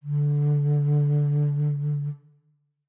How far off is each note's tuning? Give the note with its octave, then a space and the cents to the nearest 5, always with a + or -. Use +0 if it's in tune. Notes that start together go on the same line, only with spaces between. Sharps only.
D3 -10